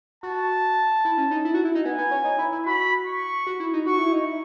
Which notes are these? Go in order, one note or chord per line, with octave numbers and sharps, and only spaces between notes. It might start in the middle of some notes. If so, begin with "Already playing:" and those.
F#4 A5
E4
C#4
D#4
E4
F#4
E4
D#4
B3 G#5
B3
C#4
D#4
E4
E4
F#4 B5
C#6
F#4
E4
D#4
F#4 C#6
E4
D#4
E4